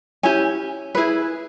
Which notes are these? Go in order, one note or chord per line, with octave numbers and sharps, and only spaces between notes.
C#4 E4 G4 G#5
E4 G#4 B4